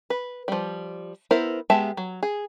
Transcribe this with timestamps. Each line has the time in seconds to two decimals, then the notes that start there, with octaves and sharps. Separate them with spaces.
0.10 B4
0.48 F3 G3
1.31 B3 E4 A#4 C5
1.70 G#3 B3 G4 E5 A5
1.97 F#3
2.23 G#4